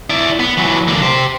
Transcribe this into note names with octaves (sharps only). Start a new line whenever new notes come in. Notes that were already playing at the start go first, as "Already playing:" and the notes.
E4 D5
B3
E3 F#3
D3 A#3
G4 C5